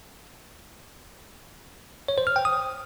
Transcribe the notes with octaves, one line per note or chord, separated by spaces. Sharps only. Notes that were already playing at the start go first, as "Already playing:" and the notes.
C#5
C5
F6
G5
D#6